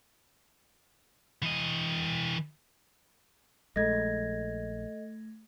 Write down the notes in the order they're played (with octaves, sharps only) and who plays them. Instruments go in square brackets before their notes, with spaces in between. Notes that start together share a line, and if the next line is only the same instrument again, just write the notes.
[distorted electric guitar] E3 D#5
[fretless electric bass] A#1 G#3 [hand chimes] A3 G#6 A#6 [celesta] A4 D#5